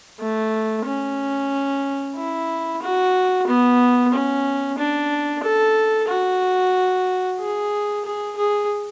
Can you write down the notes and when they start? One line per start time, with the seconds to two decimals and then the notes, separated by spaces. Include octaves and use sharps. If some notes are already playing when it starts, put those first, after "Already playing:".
0.20 A3
0.85 C#4
2.16 E4
2.82 F#4
3.47 B3
4.12 C#4
4.78 D4
5.43 A4
6.08 F#4
7.40 G#4
8.05 G#4
8.37 G#4